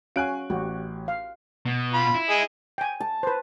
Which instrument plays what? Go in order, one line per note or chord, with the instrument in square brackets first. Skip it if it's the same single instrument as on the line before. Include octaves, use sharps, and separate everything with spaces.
[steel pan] C#4 F#4 F5 [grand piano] G#5 F#6 D7
[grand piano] A1 [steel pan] F#4 G4
[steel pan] F5
[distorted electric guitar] B2
[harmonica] F4 B5
[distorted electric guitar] E4
[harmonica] G#4 D#5
[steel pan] G5 G#5
[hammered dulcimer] A5
[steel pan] B4 C5